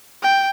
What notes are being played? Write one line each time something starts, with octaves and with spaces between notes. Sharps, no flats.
G5